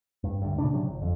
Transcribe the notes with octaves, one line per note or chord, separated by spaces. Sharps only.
G2
D2 G2
A#2 C#3 D4
A2 C3 F#3
G1
F2